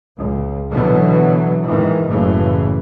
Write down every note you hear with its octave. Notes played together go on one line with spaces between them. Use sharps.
C#2
B2 D3 E3 F#3 B3
G#2 D#3 E3
F#1 A2 C#3 E3